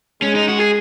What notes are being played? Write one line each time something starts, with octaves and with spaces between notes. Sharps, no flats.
G#3 C#4
D#4
F#4
G#4